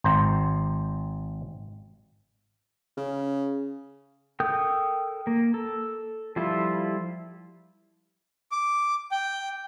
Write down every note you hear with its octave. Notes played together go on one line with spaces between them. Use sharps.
G#1 C5 A#5
C#3
A4 A#4 G5 D#6 G6
A#3
A4
F3 G3 E4 F4 A4
D6
G5